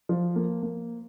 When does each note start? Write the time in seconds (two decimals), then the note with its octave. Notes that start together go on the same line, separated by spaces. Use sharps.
0.09 F3
0.36 A#3
0.63 A#3